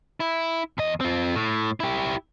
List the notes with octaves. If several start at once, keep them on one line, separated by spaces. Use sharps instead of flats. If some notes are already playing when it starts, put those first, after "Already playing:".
E4
E2 D#5
C4 F4
A2
E4 G4